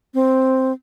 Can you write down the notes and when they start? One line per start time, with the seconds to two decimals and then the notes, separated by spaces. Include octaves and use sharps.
0.14 C4